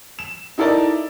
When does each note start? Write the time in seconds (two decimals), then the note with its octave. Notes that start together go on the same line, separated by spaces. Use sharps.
0.19 E7
0.58 D#4 E4 A4 A#4 D5 D#5